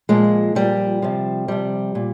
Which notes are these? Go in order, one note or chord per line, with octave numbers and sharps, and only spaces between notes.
A#2 F3 G#3
A#2 F3 G3
C3 F3
C3 F3 G3
A#2